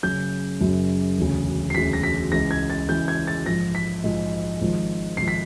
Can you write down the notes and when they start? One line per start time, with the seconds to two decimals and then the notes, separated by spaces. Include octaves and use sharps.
0.03 F#1 F#2 C#3 G6
0.61 F#1 F#2 C#3
1.18 E1 D2 C#3
1.70 C7
1.75 E1 D2 C#3 B6
1.93 A#6
2.03 B6
2.31 C#2 C#3 E3 A#6
2.51 G#6
2.70 A6
2.88 C#2 C#3 E3 G6
3.08 G#6
3.27 A6
3.46 A#1 G#2 F3 A#6
3.75 B6
4.03 A#1 G#2 F3
4.61 G#1 G#2 F3
5.17 G#1 G#2 F3 C7
5.28 B6